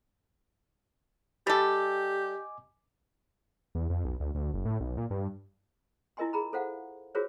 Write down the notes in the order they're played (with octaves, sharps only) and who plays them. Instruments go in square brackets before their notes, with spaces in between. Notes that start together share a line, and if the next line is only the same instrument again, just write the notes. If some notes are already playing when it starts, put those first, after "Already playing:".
[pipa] G3 A4 [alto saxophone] G4 [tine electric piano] D#5 G#5 D6
[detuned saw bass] E2
F2
B1
D2
D2
F#1
A2
B1
A#2
G2
[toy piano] E4 F4 A#4 D#5 G#5 C6
G#4 A#5 B5
A4 C5 F5 F#5
F4 F#4 G#4 A#4 C5 C#5